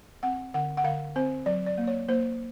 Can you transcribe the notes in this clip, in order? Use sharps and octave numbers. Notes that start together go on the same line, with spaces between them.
C4 F#5
D3 F#5
F#5
D3 F5
C4 C5
F#3 D5
D5
A#3
C#5
A#3 C5